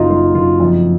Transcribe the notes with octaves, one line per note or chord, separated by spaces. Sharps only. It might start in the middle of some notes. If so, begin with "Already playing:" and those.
Already playing: F#1 F#3 D#4 F4
F#3 F4
F#1 F4
F2